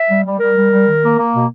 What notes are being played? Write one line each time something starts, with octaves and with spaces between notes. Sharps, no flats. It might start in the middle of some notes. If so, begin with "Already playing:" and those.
Already playing: E5
G3
G3
G3 A#4
G3
G3
D#3
A#3
A#3
B2